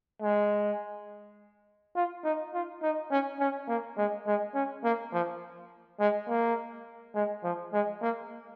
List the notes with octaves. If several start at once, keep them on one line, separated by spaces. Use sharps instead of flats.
G#3
F4
D#4
F4
D#4
C#4
C#4
A#3
G#3
G#3
C#4
A#3
F3
G#3
A#3
G#3
F3
G#3
A#3